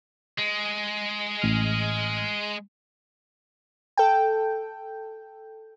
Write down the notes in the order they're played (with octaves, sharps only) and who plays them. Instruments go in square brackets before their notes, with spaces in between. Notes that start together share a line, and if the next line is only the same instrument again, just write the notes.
[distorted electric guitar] G#3
[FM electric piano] A1 F6
[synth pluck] A4 G5